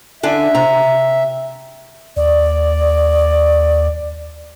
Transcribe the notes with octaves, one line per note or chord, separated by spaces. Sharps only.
D3 D4 E5 G#5
C3 A#5
D#2 D5